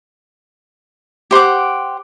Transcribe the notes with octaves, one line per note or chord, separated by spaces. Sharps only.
G4 C5 F#5 D6